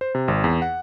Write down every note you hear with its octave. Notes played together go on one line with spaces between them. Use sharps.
C5
C3
G#1
E2
F#5